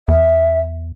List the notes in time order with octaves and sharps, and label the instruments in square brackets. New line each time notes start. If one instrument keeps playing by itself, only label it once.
[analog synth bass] E2 [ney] E5